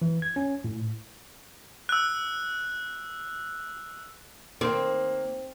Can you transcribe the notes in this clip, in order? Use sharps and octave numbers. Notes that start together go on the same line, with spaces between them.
E3
G#6
C#4
A2
E6 F#6
D#3 A#3 C4